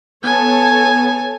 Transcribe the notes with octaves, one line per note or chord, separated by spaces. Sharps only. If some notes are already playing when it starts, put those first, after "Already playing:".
B3 A4 C#5 G#5 A5